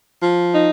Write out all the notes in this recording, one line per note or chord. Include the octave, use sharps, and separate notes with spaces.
F3
D#4